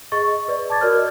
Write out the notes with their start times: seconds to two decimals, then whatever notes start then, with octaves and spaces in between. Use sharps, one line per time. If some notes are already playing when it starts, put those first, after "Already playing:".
0.12 G#4 D#5 C#6 A6
0.28 D#5
0.48 B4 D5
0.70 A5 D6 G#6 A6
0.81 F#4 A#4 C#5 D5 F6
0.95 D5 D#5